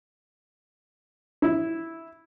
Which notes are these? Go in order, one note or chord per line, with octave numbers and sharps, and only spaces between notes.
E4